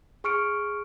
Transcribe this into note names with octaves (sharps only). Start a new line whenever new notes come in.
G#4 C#6 F6 C#7 D7